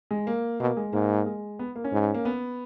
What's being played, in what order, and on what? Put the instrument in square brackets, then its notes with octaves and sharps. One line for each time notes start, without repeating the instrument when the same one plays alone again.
[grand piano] G#3
A#3
[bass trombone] B2 [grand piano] A#3
[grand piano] G#3
[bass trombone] G#2 [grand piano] A#3
[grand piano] G#3
B3
A#3
C#4
[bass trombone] G#2
[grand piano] A#3
B3